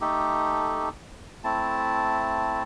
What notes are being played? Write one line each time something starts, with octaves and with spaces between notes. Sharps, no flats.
A3 D#4 G4 A4
A3 C4 E4 A5